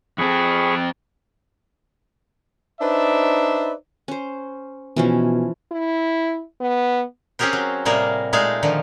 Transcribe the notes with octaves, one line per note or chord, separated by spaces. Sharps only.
F2 C4 G#4 B5 C#6
D4 D#4 B4 C5 D5 E5
C#4 C5
B2 E3 F3 C#4
E4
B3
C4 C#4 G4 G#4 A#4 C5
F#3
A2 C3 G3 A#3 G#4 A#4
A#2 G#3 A3 D#4 G#4 F5
D3 D#3 F3